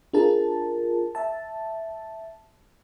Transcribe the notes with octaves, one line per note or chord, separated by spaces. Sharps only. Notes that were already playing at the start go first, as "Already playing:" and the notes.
D4 F4 G#4 A#4 A5
E5 A5